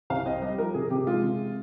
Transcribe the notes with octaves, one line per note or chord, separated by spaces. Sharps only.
C2 F5
C4 D#5
G3 D#5
F3 A#4
C3 G#4
C3 G4
G#3 F4
C3